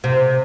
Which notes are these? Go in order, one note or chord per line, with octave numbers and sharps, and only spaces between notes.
C3